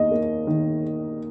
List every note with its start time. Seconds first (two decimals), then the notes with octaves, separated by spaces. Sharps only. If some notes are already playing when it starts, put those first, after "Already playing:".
Already playing: D#2 D#4 D#5
0.11 A#3
0.47 D#3